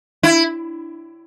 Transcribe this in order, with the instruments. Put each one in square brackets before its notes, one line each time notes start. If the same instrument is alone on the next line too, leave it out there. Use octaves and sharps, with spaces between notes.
[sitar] E4